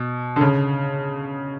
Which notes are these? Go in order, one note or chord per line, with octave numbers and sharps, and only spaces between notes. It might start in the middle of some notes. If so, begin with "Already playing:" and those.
Already playing: B2
D3
C#3